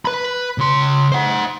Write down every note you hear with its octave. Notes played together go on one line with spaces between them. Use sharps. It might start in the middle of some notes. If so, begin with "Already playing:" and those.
B4 B5
C#3 C6
C5 F#5